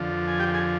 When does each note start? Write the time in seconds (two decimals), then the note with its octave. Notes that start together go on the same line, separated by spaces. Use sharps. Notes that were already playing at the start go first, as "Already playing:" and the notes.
Already playing: F2 D3 F3
0.27 G#5
0.39 G4 G5
0.54 G#4 G#5